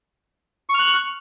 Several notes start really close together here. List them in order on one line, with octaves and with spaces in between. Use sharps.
C#6 F6 F#6